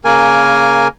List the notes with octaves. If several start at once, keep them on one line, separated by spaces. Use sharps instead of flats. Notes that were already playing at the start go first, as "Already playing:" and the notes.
C#3 A#3 A#4 G#5